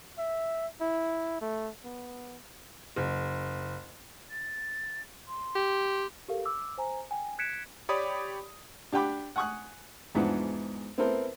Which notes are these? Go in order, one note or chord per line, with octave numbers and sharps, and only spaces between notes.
E5
E4
A3
B3
F#1
A6
C6
G4
G4 A4 A#4 F5
D6 E6
C5 G#5 A#5
G5 G#5
F#6 G#6 B6 C#7 D7 E7
G4 C#5 D5 B5 D#6
D4 G4 F#5 G5 B5 D6
F#5 G#5 C#6 D#6 F#6
E2 G#2 E3 F3 D4 F#5
B3 C4 E4 A4 A#4 C5